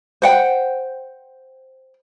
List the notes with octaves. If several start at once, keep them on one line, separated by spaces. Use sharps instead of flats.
C5 F#5 G5